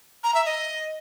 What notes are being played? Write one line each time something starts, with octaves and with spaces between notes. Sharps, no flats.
A#5
E5
D#5